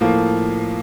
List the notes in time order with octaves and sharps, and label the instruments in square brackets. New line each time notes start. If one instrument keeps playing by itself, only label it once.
[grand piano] A2 F3 A#3